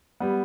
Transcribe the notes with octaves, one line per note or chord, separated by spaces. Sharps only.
G3 B3